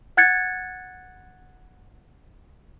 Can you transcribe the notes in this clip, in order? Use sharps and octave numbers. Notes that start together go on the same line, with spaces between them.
F#5 F#6 G#6 A6 C#7